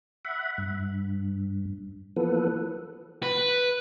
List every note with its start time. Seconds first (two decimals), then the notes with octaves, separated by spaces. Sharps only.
0.25 E5 F#5 B5
0.58 G2
2.16 E3 F3 A#3 B3 A4 B4
3.23 B4